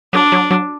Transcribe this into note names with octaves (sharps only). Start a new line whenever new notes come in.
F#3 D4
F#3
F#3